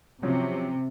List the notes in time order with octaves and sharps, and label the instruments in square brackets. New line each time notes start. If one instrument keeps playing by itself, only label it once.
[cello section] C3 [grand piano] F3 F#3 C#4